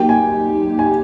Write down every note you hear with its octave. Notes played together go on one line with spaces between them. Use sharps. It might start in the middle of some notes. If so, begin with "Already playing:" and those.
Already playing: F#3 A#3 D#4 G4 G5
G#5
G#5